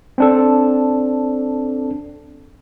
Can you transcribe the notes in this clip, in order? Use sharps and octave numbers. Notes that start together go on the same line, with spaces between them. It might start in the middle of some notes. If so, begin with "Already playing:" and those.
C4 D4 A4